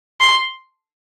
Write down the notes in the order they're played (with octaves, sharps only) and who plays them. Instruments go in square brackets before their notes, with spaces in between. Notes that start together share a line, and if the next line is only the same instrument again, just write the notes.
[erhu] C6